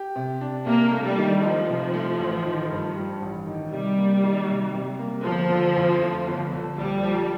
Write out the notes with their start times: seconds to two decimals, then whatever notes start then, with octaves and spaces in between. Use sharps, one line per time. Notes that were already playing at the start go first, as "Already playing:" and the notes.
Already playing: G4
0.16 C3
0.41 D4
0.67 C3 A#3
0.92 A3
1.05 G3
1.18 D#3
1.43 F3 D#4
1.69 C3
1.94 A3
2.19 A1
2.45 D#3
2.70 G2
2.96 G3
3.22 A1
3.46 D#3
3.72 C3 G3
3.98 A#3
4.23 D#3
4.48 C3
4.75 C3
4.99 A#3
5.25 G1 F3
5.50 D3
5.76 F2
6.02 A3
6.27 G1
6.52 D3
6.78 A#1 G3
7.03 F3